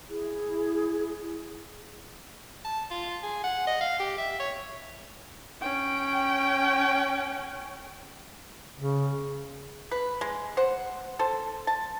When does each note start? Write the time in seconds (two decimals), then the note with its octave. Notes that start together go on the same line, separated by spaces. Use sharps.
0.09 E4 G#4
2.65 A5
2.91 F4
3.23 G#4
3.44 F#5
3.67 D#5
3.81 F5
4.00 G4
4.18 E5
4.40 C#5
5.61 C#4 G5
8.76 C#3
9.91 B4
10.21 G#3
10.57 C5 F#5
11.19 A4 C5
11.67 A5